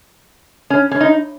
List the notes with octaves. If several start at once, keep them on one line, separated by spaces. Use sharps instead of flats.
C#4
C#4
D#4